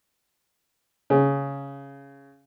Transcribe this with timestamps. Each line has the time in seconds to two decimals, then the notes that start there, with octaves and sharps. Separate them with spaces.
1.10 C#3